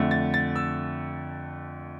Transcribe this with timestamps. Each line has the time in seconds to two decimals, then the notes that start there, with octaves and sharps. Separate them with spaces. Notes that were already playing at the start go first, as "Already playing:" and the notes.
Already playing: F2 D3 A3
0.11 A6
0.34 A6
0.56 E6